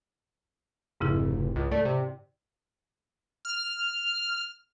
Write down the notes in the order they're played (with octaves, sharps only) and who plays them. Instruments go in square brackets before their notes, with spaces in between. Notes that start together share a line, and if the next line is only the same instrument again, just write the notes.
[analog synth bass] F1 [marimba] G#2 C#3 E4
[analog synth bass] C#2
[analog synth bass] A3 [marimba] D5
[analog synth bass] C3
[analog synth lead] F6